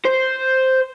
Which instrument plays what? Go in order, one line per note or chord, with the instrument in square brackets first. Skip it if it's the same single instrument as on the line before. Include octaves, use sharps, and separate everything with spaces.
[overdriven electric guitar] C5